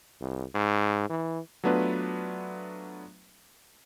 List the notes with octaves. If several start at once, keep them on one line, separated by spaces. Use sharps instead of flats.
C2
G#2
E3
F#3 A3 B3 D4 F4 B4